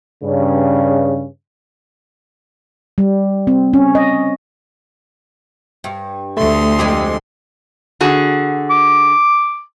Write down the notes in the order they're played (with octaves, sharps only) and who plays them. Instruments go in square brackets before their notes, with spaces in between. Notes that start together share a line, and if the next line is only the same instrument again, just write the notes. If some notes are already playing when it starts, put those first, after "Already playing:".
[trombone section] G2 C#3
[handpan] G3
C4
C#4
D#5
[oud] G2
[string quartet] D2 C6 [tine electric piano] A3
[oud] F2 G#3 G4
[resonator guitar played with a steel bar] D3 F#4 G#4
[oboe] D6